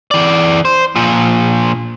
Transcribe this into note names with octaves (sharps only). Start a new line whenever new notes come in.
E3 D5
C5
A#2 F3